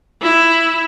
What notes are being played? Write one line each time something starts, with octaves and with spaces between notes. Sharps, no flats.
E4